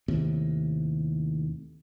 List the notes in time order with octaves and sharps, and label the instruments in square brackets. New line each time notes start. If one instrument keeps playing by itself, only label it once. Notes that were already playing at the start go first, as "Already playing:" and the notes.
[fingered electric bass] D#2 A2 C3